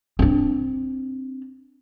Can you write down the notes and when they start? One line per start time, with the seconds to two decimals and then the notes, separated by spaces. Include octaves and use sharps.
0.19 C4 D4